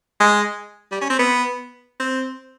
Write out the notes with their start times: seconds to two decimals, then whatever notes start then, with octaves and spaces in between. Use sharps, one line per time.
0.20 G#3
0.91 G3
1.01 C#4
1.10 C4
1.19 B3
2.00 C4